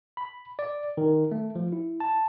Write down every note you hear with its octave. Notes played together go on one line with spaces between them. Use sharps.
B5
D5
D#3
A3
F3
E4
A5